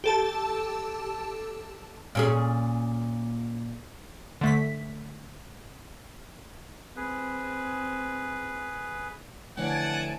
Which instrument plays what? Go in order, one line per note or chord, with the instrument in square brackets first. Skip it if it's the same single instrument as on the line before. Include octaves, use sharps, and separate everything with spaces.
[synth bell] G4 A4 A5
[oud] A#2 C#4 G#4
[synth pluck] D3 A3 B6
[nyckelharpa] C4 [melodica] G#4 B4
[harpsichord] A2 D3 E3 [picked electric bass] F3 [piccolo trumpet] F#5 [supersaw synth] G#5 A5 D7